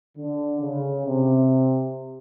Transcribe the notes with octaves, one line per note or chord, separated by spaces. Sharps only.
D3
C#3
C3